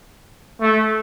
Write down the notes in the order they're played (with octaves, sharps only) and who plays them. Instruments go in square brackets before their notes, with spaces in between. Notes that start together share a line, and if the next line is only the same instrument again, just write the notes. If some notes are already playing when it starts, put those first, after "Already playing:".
[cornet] A3